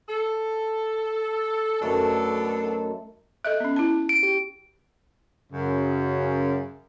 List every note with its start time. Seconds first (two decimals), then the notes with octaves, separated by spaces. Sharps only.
0.08 A4
1.81 F#2 B2 A3 D4 D#4 A4
3.45 A4 D#5 E5 F#6
3.60 B3 C#4
3.76 E4 A5
4.09 D7
4.23 G4
5.53 F#2 C#3